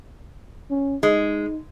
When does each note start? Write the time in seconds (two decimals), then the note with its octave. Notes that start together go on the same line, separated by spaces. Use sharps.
0.71 C#4
1.03 G#3 D#4